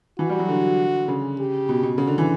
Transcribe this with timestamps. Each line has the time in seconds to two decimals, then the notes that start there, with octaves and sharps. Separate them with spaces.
0.19 E3 F#4
0.29 G3
0.39 F#3
0.49 D3
1.08 C#3
1.38 G4
1.69 B2
1.83 B2
1.98 C#3 F#4
2.07 D3
2.18 E3